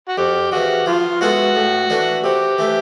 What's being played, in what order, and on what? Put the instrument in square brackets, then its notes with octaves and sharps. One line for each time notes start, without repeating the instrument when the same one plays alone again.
[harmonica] F#4
[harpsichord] F2 [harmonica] G4
[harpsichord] C#3 E3 [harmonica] F#4
[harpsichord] F3 [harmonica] F4
[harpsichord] G#3 B3 E4 A4 [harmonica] F#4
[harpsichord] A2
E3 A3 D4
[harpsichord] C3 [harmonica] G4
[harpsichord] E3 A3